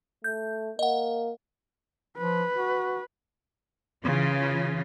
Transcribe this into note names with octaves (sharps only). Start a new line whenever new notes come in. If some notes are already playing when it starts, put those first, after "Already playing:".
A3 G6
A#3 D#5 F#5
F3 B4
F#4
C#3 E3 F4